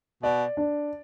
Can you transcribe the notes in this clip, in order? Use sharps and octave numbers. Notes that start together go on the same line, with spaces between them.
B2 D5
D4